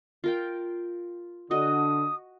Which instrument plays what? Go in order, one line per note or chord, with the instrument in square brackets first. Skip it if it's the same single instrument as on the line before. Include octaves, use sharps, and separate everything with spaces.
[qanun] F4 A#4 G5
[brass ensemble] D3 [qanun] F#4 D#5 [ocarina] D#6